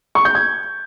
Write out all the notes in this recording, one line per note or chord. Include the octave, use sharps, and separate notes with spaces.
C#6
G6
G#6